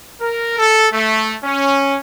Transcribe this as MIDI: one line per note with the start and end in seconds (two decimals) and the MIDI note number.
0.20 0.57 70
0.58 0.88 69
0.92 1.33 57
1.44 1.96 61